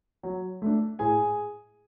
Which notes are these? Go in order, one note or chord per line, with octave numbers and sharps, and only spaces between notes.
F#3
A3 D4
A2 G#4 G#5